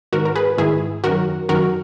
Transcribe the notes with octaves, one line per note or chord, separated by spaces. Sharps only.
G#2 D#3 F#4 A#4
A#4
G#4 B4
G#2 D#3 E4 G#4
F#2 D#3 F#4 A#4
F#2 D#3 F#4 A#4